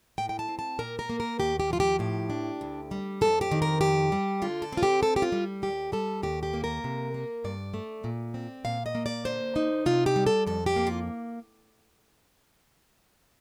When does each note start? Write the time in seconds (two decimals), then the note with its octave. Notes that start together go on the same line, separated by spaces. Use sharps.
0.18 A2 G5
0.29 G5
0.39 A5
0.48 C4
0.59 A5
0.79 A#2 A#4
0.99 A#4
1.10 A#3
1.20 A#4
1.39 D#2 G4
1.60 G4
1.70 F3 F4
1.80 G4
1.99 A2 G4
2.30 D4
2.61 D2
2.91 G3
3.21 F2 A4
3.41 G4
3.51 D#3
3.62 A#4
3.81 F2 G4
4.12 G3
4.42 D3 F4
4.62 A4
4.72 C4 F4
4.83 G4
5.01 D2 A4
5.16 G4
5.22 F4
5.32 G3
5.62 D#2 G4
5.92 G3 A4
6.23 D#2 G4
6.43 G4
6.54 A#3
6.64 A#4
6.84 C3
7.14 A#3
7.44 G2 D5
7.74 A3
8.04 A#2
8.34 C4
8.65 A#2 F5
8.86 D#5
8.95 A#3
9.06 D5
9.25 D3 C5
9.56 D#4
9.86 C3 F4
10.06 G4
10.16 G3
10.26 A4
10.47 F2 A4
10.66 G4
10.76 A#3
10.87 F4